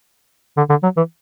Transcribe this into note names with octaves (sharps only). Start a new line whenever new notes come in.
D3
D3
F#3
E3